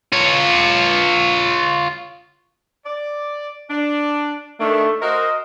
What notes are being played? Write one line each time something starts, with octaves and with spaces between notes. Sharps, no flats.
F4 C#5
D5
D4
D#3 A3 D4
F#4 A#4 C5 D#5